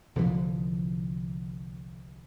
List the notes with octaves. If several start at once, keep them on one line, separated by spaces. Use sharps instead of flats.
C2 D3 E3 F3